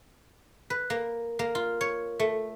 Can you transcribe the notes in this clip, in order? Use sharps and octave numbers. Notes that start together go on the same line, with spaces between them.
B4
A#3
A#3
F4
C#5
A3